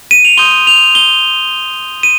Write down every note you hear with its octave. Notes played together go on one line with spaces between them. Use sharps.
D#7
F7
C6 D#6 G6 G7
F7
G7
D#7